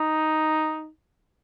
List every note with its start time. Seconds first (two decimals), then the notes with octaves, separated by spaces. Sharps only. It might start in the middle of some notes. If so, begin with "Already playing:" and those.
Already playing: D#4